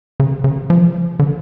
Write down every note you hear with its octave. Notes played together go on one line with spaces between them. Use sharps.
C#3
C#3
F3
D3